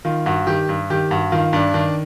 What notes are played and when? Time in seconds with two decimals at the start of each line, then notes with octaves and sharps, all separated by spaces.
0.05 D#3 F4
0.26 G2 F#4
0.47 D#3 G4
0.69 G2
0.90 D#3 G4
1.11 G2 F#4
1.32 D#3 F4
1.53 G2 D4
1.74 D#3 D4